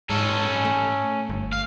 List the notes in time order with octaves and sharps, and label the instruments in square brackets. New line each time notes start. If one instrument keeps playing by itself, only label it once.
[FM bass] G#2 [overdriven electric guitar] C#4 A4
[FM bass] A3
G1
[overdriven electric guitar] F5